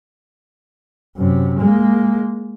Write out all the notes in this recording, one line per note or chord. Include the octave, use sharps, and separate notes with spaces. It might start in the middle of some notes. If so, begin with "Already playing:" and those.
F#2 C3
G#3 A#3